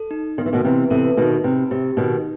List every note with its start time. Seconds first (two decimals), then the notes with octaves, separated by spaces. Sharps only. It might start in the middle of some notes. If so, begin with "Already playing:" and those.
Already playing: A4
0.11 D#4
0.38 D#3 B3
0.46 E3
0.53 B2 D#3
0.64 C3 E3 B3
0.90 C3 E3 A4
1.17 B2 D#3 D#4
1.44 C3 B4
1.71 C3 G4
1.97 B2 D#3 D#4